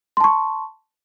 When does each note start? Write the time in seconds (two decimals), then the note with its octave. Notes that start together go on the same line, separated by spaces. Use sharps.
0.17 C6
0.21 A5
0.24 C#6